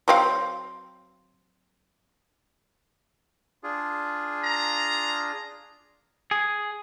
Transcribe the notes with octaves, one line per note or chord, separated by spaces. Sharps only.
F#3 C4 F5
D4 F4 G#4
A#5
G#4